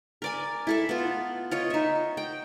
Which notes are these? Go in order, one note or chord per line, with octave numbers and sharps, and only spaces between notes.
A#4 D5 G#5
E4 A4 E5
B3 F4
F4 C#5 D#5
D#4 E5
G5